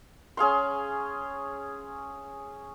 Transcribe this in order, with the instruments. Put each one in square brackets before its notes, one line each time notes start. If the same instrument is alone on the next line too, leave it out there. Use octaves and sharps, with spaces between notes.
[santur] C#4 G#4 F5 C6